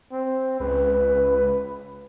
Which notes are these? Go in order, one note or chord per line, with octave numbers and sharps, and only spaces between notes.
C4
C#2 B4